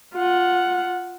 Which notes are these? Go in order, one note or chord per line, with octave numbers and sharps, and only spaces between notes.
F4 F#5